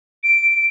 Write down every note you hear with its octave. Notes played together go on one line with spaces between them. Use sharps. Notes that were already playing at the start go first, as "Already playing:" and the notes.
D7